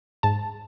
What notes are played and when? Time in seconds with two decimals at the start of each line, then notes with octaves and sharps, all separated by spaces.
0.23 G#2 A5